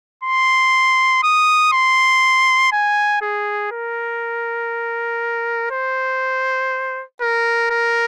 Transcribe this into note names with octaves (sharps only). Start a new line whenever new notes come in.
C6
D#6
C6
G#5
G#4
A#4
C5
A#4
A#4